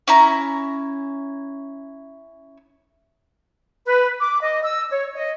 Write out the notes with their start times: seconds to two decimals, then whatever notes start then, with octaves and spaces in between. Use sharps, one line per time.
0.08 C#4 E4 A#5
3.86 B4
4.20 D6
4.41 D#5
4.63 E6
4.90 C#5
5.14 D#5